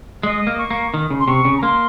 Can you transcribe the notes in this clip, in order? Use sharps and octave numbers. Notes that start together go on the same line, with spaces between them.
G#3 D#5
A#3
C#6
A#3
D#3
C#3
C6
C3 C#6
C#3
A#5
A#3 C6